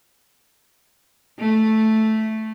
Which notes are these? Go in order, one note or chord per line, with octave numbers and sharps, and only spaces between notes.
A3